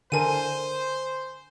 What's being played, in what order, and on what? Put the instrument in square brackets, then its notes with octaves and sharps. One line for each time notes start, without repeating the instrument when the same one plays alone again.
[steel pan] D3 A4 A#4 [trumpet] C5 [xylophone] G#5 D#7